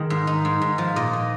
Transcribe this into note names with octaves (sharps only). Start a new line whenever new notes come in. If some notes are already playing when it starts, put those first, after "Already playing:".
Already playing: D#3 G#3
G#2
D#4
G#2
G#2
F3
A#2 D#5
A#2